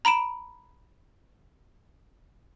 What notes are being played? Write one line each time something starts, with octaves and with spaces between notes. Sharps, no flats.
A#5 B5 D7 E7